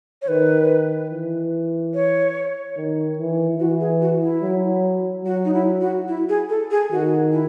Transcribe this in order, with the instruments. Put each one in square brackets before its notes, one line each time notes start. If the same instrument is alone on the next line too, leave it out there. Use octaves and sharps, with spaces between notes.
[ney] C#5
[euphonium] D#3 [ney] B4
[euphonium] E3
[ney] C#5
[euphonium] D#3
E3
[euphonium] E3 [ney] F#4
[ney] G#4
F#4
E4
[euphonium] F#3
[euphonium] F#3 [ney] F#4
[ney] D#4
E4
F#4
E4
G#4
A4
G#4
[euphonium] D#3 [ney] F#4
[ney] E4